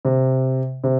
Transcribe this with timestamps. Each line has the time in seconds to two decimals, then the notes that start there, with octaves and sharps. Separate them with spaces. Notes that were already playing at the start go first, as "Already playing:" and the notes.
0.05 C3
0.84 C3